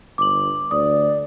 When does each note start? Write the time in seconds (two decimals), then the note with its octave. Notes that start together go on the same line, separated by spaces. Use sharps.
0.18 G1 D6 F#7
0.71 D2 D5 D#6